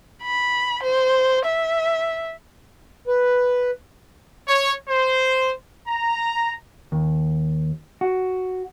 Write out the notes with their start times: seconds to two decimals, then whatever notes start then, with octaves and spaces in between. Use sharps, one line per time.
0.23 B5
0.83 C5
1.45 E5
3.07 B4
4.47 C#5
4.89 C5
5.88 A#5
6.92 D#2
8.01 F#4